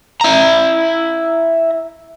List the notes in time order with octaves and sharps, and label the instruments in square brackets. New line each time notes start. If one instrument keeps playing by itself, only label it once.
[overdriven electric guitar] E4 A#5